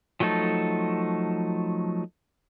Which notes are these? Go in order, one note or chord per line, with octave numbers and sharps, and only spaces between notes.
F3 F#3 A3 D#4 A4